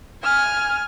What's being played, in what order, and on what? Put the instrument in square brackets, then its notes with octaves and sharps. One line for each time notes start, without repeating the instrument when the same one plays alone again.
[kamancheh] G#5 F6